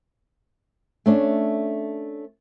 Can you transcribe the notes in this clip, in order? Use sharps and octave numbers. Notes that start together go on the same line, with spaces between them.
A3 C#4 D4